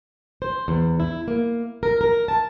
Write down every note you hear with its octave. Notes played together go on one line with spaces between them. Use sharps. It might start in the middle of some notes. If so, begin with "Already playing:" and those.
C5
E2
E4
A#3
A#4
A#4
A5